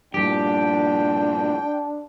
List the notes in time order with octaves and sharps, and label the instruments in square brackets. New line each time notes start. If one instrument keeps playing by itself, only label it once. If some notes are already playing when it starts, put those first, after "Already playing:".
[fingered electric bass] G2 A#2 [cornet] D4 [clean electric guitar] G4 [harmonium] G5